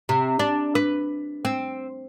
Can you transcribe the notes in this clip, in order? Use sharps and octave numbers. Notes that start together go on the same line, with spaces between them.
C3
D4
B4
C4